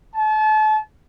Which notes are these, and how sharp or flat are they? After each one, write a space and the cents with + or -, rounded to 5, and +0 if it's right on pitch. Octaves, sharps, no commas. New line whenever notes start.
A5 -35